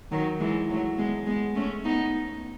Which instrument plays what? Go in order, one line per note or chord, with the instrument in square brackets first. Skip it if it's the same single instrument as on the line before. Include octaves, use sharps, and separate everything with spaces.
[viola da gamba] D#3 F#3
E3 G#3
F#3 A3
G#3 B3
G#3 B3
A3 C#4
B3 D#4